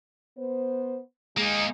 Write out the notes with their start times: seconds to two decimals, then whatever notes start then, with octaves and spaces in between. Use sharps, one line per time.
0.38 B3 C5
1.37 G#3 A#3 D#4